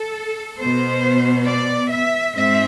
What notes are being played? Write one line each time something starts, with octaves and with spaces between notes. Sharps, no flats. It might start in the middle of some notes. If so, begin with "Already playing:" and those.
Already playing: A4
B2 B3 C5
D5
E5
G#2 G#3 C4 E5